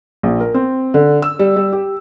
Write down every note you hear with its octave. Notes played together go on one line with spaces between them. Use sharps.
A#1
A#4
C4
D3
E6
G3
G3
G4